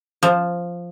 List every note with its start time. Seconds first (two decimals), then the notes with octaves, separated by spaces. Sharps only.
0.23 F3